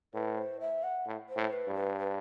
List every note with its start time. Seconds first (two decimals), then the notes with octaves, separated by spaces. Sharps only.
0.14 A2 B4
0.37 C5
0.61 E5
0.83 F#5
1.06 A2
1.29 C5
1.37 A2
1.52 B4
1.68 G2
1.75 B4
1.98 B4